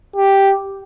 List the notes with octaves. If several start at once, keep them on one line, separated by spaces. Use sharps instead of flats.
G4